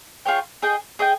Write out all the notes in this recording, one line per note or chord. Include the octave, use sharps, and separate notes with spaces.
F4 G#4 C#5 G5
G#4 D#5 G5
G#4 D#5 G5